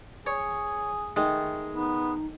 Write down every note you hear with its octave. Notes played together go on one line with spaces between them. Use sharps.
G#4 C#5
D#3 G#3 A3
B3 D#4